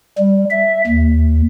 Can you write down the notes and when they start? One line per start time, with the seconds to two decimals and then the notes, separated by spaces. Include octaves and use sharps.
0.18 G3
0.50 E5
0.87 D#2